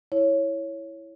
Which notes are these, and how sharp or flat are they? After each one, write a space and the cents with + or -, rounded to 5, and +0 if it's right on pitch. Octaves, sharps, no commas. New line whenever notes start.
E4 +0 C#5 +0